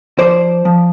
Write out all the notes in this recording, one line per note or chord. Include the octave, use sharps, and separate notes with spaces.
F3 C5 D5
F3